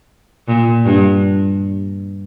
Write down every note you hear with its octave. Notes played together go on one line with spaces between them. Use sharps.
A#2
G2